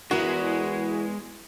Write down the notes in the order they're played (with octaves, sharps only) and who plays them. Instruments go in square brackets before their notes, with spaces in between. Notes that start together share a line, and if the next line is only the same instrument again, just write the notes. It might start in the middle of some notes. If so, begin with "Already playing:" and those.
[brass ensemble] E2 [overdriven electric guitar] G#3 [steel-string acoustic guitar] B3 E4 A#4 [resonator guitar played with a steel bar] F#4